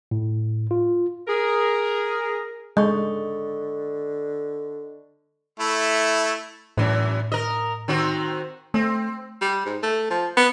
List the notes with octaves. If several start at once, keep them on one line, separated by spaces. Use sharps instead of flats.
A2
F4
G#4 A#4
D3 G#3 D#5 C#6
A3 E4
F#2 A2 E3
A#4 D#5
D#3 C4 F#4
A3 C4
G3
G#2
A3
F3
B3